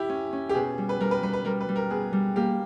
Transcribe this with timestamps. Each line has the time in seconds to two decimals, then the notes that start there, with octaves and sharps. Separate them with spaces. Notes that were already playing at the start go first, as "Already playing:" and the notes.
Already playing: E4 G4
0.09 C#4
0.33 C#4
0.49 G4
0.54 B2 G#4
0.78 G3
0.89 B4
1.00 G3 A#4
1.11 B4
1.23 G3 B4
1.33 B4
1.45 G3 A#4
1.61 B4
1.69 G3
1.76 A#4
1.90 B3 G#4
2.13 G3
2.36 A#3 G4